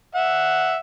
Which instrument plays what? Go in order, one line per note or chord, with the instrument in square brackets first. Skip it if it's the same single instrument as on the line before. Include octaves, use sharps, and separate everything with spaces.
[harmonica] E5 F#5